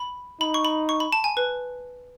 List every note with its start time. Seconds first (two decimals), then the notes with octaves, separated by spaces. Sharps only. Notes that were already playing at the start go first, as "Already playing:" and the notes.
Already playing: B5
0.41 D#4 B5
0.54 C#6
0.65 B5
0.89 C#6
1.00 B5
1.13 A5
1.24 G#5
1.37 B4